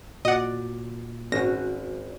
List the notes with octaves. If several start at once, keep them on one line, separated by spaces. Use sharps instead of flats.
A#2 F#4 D5 D#5 F#5
G#1 C#4 F#4 A#6